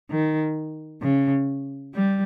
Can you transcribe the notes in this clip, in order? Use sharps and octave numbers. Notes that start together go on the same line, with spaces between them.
D#3
C#3
G3